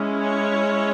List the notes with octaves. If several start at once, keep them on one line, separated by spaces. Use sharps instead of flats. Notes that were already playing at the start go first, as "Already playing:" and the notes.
Already playing: G#3 C#4 E4
C#5